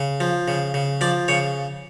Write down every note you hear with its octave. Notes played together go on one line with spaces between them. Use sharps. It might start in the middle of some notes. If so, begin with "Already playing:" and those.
Already playing: C#3
F3
C#3
C#3
F3 D5
C#3 C#5